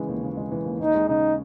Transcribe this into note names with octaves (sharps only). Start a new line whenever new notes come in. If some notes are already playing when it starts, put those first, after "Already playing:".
Already playing: C#3 E3 G#3
D#2
C#3
G#3
E3
D#2
D#2 D#4
G#3
C#3 D#4